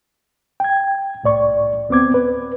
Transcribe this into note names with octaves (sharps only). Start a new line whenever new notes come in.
G5 G#6
C2 A2 D5 C#6
D2 B3 C4 D6 G#6
B4